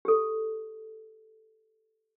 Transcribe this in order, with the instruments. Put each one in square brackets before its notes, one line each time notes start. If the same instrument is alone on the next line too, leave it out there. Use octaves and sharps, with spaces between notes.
[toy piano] G4 A4